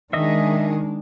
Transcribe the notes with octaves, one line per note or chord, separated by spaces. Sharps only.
D#3 G#3 D4 G#4 D#5 E5